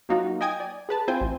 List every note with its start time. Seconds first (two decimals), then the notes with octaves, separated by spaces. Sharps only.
0.09 F#3 A#3 D#4 F4 F#4
0.41 D#5 G5 G#5 D#6 G#6
0.60 D5
0.89 G#4 B4 A5
1.08 C4 E4 F4 C5 G5 G#5
1.21 A1